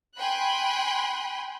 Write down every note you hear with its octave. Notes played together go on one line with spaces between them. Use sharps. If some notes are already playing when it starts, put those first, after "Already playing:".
G5 G#5 B5 C6 F#6